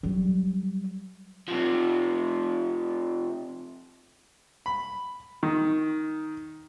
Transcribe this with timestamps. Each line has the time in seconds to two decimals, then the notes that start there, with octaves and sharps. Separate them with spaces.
0.03 F#3 G3
1.48 C3 F3
4.66 B5
5.43 D#3